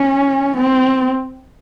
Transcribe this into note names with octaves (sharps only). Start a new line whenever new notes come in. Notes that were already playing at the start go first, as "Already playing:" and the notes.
Already playing: C#4
C4